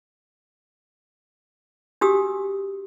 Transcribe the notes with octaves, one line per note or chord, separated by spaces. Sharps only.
D4 F#4 G4 D#6 E6